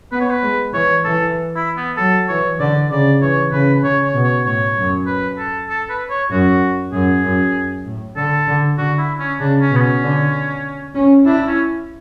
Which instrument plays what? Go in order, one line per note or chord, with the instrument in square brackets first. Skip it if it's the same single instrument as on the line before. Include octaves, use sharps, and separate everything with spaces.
[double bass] B3 [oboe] B4
[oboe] C#5
B4
[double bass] G#3
[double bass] E3 [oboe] C#5
[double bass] E3 [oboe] A4
[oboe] E4
B3
[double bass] F#3 [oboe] A4
[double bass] E3 [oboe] C#5
[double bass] D3 [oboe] D5
[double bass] C#3 [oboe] D5
[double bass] E3 [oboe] C#5
[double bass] C#3 [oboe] B4
[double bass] C#3 [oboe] C#5
[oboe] C#5
[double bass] B2
[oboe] C#5
[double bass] A2 [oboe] C#5
[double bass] F#2
[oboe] B4
A4
A4
B4
C#5
[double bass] F#2 [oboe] F#4
[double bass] F#2 [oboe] G#4
[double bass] F#2
A2
[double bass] D3 [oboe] A4
[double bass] D3
[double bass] D3 [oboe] F#4
[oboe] E4
C#4
[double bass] C#3 [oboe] D4
[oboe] C#4
[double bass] B2
[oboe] B3
C#4
[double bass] D3
C#4
[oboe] D4 [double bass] E4
[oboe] C#4